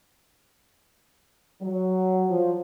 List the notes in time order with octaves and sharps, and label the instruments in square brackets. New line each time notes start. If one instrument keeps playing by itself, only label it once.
[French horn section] F#3
F3